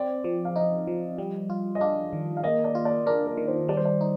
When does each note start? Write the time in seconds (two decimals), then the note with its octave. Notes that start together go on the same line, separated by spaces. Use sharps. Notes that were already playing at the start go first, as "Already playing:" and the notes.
Already playing: C4 D5
0.24 F3
0.45 F5
0.56 D#4 D#5
0.87 F3
1.18 G3
1.50 F4
1.75 D#5
1.81 D4 F5
2.13 D#3
2.37 F5
2.44 A#3 D#5
2.64 D5
2.75 F4
2.85 D5
3.06 D4 A#4
3.27 A#4
3.37 D#3
3.48 C5
3.69 G3 D5
3.77 C5
3.85 D5
4.01 D#4